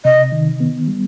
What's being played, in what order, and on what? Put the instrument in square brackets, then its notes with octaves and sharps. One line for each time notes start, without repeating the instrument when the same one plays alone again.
[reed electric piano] C3 [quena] D#5
[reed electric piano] D#3
B3
G3